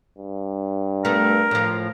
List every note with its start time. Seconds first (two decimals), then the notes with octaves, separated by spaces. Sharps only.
0.18 G2
1.05 A3 B3 A#4
1.51 A2 F3